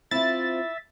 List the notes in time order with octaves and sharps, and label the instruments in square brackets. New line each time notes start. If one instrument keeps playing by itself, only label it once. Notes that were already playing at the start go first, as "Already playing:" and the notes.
[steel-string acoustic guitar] C4 F4 [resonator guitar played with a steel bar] E4 [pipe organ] E5 [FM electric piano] A6